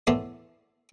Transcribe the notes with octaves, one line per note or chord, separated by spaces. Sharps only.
A2 E3 B3 A4 D5 C6